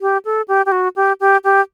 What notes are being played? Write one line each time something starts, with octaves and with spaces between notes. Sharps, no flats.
G4
A4
G4
G4
F#4
G4
G4
G4